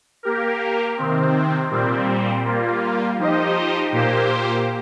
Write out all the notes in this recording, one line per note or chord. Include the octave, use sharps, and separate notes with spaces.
A#3 G4 A#4
C3 D#3 C4
A#2 G3 C4
G3 A#3 F4
F3 D#4 G4 C5 D#5
A#2 A#3 G4 C5